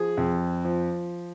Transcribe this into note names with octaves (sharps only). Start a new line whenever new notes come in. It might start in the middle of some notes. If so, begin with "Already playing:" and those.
Already playing: F3 G#4
F2
F3